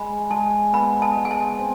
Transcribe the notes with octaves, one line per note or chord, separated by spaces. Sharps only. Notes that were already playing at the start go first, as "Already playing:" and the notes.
Already playing: G#3 B5
G#3 A5
B3 B5
A5
G#3
G#5
A5
C4